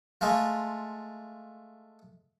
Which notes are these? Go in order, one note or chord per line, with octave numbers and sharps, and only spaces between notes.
G#3 A3 F4